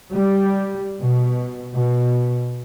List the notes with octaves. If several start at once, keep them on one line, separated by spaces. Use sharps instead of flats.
G3
B2
B2